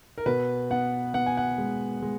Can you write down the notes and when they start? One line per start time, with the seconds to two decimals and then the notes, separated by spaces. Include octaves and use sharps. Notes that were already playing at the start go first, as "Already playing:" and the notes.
0.18 A#4
0.26 B2 B4
0.70 B3 F#5
1.14 B3 F#5
1.26 G#5
1.37 F#5
1.58 G#3
2.02 G#3